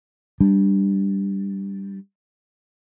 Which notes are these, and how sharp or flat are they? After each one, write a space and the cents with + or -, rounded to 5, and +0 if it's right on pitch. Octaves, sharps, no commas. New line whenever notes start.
G3 +0 D4 +0